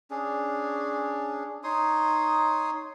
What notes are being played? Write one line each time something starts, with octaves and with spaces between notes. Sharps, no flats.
C#4 D4 G#4
D#4 C#5 C6 D#6